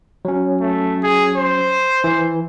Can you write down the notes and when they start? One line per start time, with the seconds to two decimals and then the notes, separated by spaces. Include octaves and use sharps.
0.25 F#3 C#4
0.60 A3
1.03 G#4
1.36 C5
2.04 E3